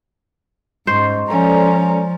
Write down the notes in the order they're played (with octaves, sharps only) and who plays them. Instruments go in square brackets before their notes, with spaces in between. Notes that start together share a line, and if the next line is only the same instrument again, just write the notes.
[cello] G#2 [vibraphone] C#4 D#5 C6 [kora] C5
[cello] F3 [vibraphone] G#3 A4 D5 [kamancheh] C#4 A#5